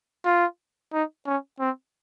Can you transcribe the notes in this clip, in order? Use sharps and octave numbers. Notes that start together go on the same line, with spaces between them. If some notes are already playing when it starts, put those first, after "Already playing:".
F4
D#4
C#4
C4